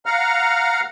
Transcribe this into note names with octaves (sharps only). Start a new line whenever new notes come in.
F5 F#5 A#5 F6